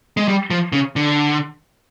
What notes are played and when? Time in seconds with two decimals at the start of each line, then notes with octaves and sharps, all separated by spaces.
0.17 G#3
0.28 G3
0.50 F3
0.73 C#3
0.96 D3